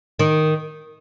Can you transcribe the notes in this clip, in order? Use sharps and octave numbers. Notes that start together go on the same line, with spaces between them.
D#3